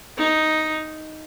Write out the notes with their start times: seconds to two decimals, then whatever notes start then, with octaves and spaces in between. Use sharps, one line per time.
0.17 D#4